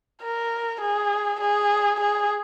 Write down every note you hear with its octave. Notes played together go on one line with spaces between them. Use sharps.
A#4
G#4
G#4
G#4